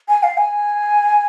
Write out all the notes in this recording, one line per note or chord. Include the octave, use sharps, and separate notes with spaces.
G#5
F5
G#5